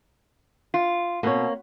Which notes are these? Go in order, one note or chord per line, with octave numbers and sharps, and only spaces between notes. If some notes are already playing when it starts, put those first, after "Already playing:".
F4
B2 A#3 C4 C#5